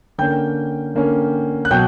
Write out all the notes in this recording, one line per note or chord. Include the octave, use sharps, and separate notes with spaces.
D3 A#3 C#4 G5 G6
D3 A#3 C#4
F#6
B2 F#3 G5 G6